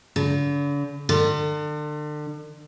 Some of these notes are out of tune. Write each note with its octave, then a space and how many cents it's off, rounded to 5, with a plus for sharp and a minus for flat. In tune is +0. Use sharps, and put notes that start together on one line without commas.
D3 -45
D3 +35